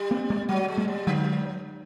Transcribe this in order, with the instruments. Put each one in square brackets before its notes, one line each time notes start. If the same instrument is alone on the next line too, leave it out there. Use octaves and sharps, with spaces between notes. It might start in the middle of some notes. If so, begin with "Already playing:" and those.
Already playing: [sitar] G3
[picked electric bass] A#3 C4
G#3 A#3
[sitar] F#3 [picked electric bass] G3 A3
[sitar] G#3
[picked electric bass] G3 A3
[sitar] G3
[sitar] D3 [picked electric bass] F#3 G#3